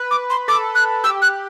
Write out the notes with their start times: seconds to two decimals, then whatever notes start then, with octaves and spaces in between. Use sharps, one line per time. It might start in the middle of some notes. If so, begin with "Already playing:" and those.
Already playing: B4
0.11 D6
0.30 C6
0.48 A4 D6
0.75 F#6
1.04 G4 E6
1.22 F#6